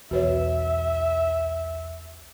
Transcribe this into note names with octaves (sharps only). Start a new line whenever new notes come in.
B1 E2 F#4 B4 C#5 E5